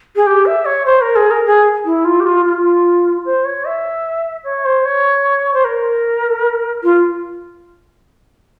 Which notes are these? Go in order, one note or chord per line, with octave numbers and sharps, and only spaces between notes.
G#4
G4
E5
C#5
C5
A#4
G#4
A#4
G#4
E4
F4
G4
F4
F4
C5
C#5
E5
C#5
C5
C#5
C5
A#4
F4